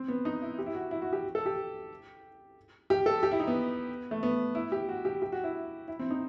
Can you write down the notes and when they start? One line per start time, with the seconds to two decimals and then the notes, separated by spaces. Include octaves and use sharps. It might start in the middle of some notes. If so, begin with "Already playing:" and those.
Already playing: C4
0.08 B3
0.25 D#4
0.42 E4
0.59 G4
0.66 E4
0.75 F#4
0.91 E4
1.02 F#4
1.13 G4
1.35 A4
1.46 G4
2.90 G4
3.06 A4
3.23 G4
3.32 E4
3.39 D#4
3.47 B3
4.11 A3
4.23 B3
4.55 E4
4.72 G4
4.89 F#4
5.05 G4
5.22 G4
5.32 F#4
5.44 E4
5.88 E4
5.99 C4
6.11 D#4